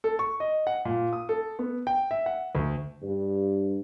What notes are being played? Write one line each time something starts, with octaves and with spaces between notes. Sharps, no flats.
A4
C#6
D#5
F#5
A#2
D#6
A4
B3
G5
E5
F#5
D2
G2